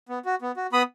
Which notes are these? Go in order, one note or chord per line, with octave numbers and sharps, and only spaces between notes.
B3
F#4
B3
F#4
B3 B5 D#6